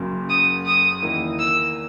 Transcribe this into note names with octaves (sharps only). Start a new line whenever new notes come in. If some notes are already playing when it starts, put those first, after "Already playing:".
Already playing: F#1 F#2 C#3 F#3 A#3
D#6
D#6
E2 D#3 A#3 E4
E6